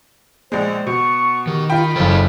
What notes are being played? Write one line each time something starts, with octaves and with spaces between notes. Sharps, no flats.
A#1 G#3 C5
B2 C#6
D#3 G4
F4 G5 B5
F#1 A4 C5 A6